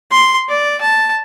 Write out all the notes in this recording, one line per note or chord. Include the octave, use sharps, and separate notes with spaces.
C6
D5
A5